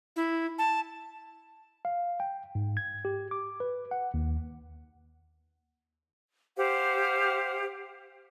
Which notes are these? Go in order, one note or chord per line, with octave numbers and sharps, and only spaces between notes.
E4
A5
F5
G5
G#2
G#6
G4
D6
B4
F#5
D#2
G4 C5 F5 F#5